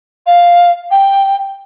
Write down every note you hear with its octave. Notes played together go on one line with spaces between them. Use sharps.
F5
G5